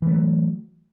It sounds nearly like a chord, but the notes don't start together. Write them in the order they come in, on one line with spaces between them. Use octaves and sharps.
E3 A3 F#3